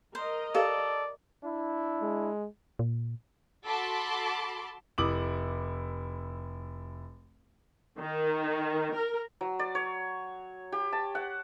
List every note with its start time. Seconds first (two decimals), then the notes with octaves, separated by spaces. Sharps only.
0.15 A#4 C5 D#5
0.55 G4 A4 D5 F5
1.44 D4 E4
2.02 G#3
2.79 A#2
3.67 F#4 A4 A5 B5 C6 D6
4.98 F1 E4 D6 D#6 F#7
7.99 D#3
8.94 A#4
9.41 F#3
9.59 D5
9.75 C#5
10.72 G4
10.93 A5
11.15 F#5